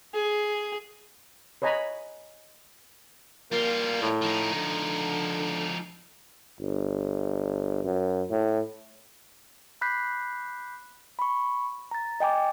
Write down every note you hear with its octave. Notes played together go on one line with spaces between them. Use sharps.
G#4
B4 C#5 D#5 G#5 A#5 B5
G3 A#3 F4
A2
F3 D#4
D3
G1
F#2
A2
B5 D6 F#6 G6 B6 C7
B5 C#6
A#5 A6
D#5 G5 G#5 D6